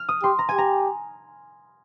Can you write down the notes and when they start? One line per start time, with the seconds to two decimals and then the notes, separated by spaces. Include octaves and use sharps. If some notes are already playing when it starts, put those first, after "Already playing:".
Already playing: F6
0.09 D#6
0.23 G4 C6
0.39 A#5
0.49 G4 G#5
0.58 A#5